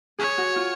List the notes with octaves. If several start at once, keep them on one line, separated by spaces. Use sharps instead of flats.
G#4 C#5
F#4
F4